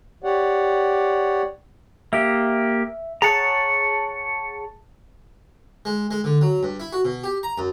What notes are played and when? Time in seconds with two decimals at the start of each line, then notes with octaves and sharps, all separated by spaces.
0.24 G4 C#5 D5 F#5
2.13 A#3 G4 E5
3.22 G#4 C#5 F#5 A5 A#5
5.85 G#3
6.11 G#3
6.24 D3
6.41 F#3
6.63 G2
6.80 E4
6.93 F#4
7.05 B2
7.24 G4
7.43 A#5
7.58 F#2